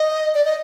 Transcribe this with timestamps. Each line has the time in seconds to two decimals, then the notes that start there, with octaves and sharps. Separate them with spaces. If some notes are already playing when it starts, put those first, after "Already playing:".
Already playing: D#5
0.35 D5
0.45 D#5